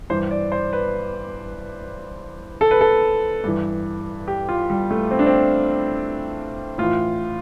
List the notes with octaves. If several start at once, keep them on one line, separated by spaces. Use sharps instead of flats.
G2 E3 C5
D5
C5
B4
A4
B4
A4
G2 E3
G4
F4
G3
A3
C4
D4
C4
A2 E3 F4